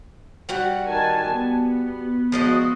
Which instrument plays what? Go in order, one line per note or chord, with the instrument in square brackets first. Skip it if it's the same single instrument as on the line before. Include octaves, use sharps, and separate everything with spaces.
[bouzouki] G3 F#4 F#5
[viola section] D#3 G#5 A5
B3
[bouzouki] F3 G#3 D#5 [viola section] B3 F#4